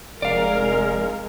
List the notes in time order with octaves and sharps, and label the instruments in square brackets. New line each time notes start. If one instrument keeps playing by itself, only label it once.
[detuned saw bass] F1 [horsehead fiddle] G#3 [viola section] A#4 [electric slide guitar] D5 F5